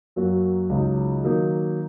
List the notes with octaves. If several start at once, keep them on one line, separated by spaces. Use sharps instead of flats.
F#2 F#3 A#3 F#4
C#2 C#3 F#3 D#4
D#3 F#3 A#3 D#4